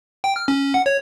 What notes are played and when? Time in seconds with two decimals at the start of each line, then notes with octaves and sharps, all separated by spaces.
0.24 G5
0.36 F6
0.48 C#4
0.74 F#5
0.86 C#5